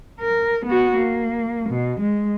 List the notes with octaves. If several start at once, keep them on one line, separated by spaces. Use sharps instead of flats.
A#4
B3 F#4
A#3
B2
G#3